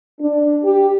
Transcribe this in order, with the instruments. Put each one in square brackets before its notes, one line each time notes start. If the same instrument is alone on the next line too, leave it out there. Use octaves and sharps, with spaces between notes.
[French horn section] D4
G4